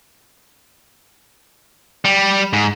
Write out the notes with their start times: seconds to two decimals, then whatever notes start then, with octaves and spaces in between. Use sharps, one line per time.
2.05 G3
2.53 G#2